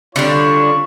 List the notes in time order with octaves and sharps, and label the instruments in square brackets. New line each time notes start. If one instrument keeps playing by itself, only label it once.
[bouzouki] D3 G3 D4 [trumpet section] F4 C#5 C#6